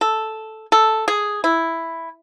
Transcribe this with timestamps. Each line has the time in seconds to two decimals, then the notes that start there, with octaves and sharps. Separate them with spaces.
0.01 A4
0.72 A4
1.08 G#4
1.44 E4